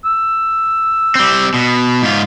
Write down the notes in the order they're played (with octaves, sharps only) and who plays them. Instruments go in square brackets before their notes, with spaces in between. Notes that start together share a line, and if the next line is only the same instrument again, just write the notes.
[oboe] E6
[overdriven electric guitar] G3 C4
B2
G#2 F4